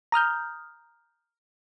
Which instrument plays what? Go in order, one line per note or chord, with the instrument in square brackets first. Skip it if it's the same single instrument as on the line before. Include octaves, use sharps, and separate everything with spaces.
[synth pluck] A#5 D#6 F6 G6